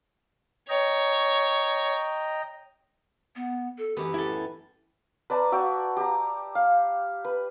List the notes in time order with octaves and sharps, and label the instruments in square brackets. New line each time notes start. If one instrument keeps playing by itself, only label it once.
[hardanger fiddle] C#5 [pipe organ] D#5 G5 A#5
[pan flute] B3
A4
[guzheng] F#2 E3 B3 [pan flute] G4
[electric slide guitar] E4 A4
[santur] B4 D5 A5 A#5
F#4 E5 G5
G4 A#5
F5
B4